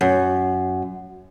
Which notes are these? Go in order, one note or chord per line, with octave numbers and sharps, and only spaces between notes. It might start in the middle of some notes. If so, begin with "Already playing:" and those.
F#2